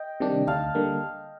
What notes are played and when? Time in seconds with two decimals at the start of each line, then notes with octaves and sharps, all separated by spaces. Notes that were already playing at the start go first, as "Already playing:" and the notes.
Already playing: D#5 G5
0.20 C3 D#3 G3 D4
0.47 D2 F5 A5
0.75 D3 G3 A#3